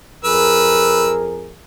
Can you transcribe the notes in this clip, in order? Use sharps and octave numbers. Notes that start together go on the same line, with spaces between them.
F2 G#4 A#4 B4 E6